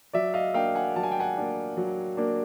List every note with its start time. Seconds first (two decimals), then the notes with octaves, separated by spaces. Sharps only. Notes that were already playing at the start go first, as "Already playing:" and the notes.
0.13 F#3 D5 E5
0.34 D#5 F5
0.54 A#3 D4 F5 G5
0.75 F#5 G#5
0.96 F#3 A5
1.03 G#5
1.12 G5
1.20 F#5 G#5
1.37 A#3 D4
1.77 F#3
2.17 A#3 D4